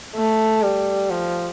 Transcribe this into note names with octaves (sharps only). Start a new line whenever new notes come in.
A3
G3
F3